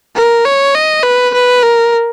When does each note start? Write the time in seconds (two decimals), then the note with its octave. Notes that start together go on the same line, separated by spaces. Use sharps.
0.16 A#4
0.45 C#5
0.75 D#5
1.04 B4
1.34 B4
1.63 A#4